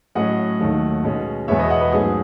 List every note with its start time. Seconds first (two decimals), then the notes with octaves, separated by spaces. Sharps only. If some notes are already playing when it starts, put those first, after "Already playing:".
0.15 A2 F#3 C#4 D#5 F#5
0.60 D#2 D#3 F#3 A3
1.04 B2 G#3 C#4
1.48 E2 B2 G#3 B3 C#5 E5
1.59 B4 D#5
1.70 D#5 F#5
1.81 B4 D#5
1.92 G#2 F#3 A3 C#4 G#4